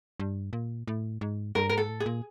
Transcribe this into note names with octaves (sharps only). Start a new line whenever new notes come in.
G2
A#2
A2
G#2
G2 A#4
G#2 A#4
A4
A2
G#4
A#2